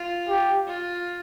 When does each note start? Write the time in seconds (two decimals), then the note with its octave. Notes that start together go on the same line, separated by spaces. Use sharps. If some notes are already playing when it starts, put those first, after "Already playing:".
Already playing: F4
0.29 G4
0.68 F4